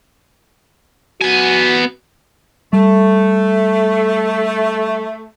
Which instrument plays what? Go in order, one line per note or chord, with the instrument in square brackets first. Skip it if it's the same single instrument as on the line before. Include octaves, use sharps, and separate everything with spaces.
[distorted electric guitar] B3 G#5 [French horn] F#4
[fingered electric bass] G3 [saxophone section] A3